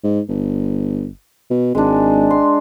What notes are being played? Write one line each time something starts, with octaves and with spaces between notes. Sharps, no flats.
G#2
G1
B2
G#1 G#3 D4
C6